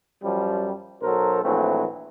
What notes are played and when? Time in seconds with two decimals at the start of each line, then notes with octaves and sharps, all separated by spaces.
0.22 F#2 F3 G3
1.02 B1 F#3 A4 A#4 C5
1.42 A#1 E3 F#3 A3 C4